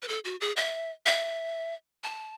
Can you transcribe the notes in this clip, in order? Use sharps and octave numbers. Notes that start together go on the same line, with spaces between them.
B4
A4
F#4
G#4
E5
E5
A5